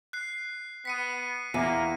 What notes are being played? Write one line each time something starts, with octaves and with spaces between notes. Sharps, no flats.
F#6 C7
B3 B6 C#7 D#7
E2 A#3 D#7